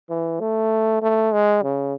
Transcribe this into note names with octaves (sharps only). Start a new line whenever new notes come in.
E3
A3
A3
G#3
C#3